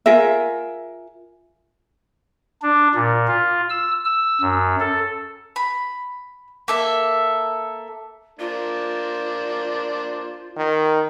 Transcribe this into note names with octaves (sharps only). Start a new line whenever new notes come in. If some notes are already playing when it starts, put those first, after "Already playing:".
F4 G#4 A#4 E5
D4
A#2
F4
E6
E6
F#2
A4
B5
A#3 A4 E5
A#3 D4 F4 C5
D#3